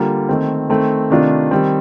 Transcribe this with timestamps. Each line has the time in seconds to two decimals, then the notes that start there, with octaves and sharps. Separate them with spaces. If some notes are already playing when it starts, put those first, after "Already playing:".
Already playing: D3 G3 A#3 F4
0.29 D#3 A3 C4
0.69 D#3 A3 C4
1.10 C3 D#3 A3 D4 F4
1.51 D#3 G3 C4